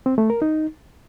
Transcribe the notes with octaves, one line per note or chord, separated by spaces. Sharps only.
C4
A3
A#4
D#4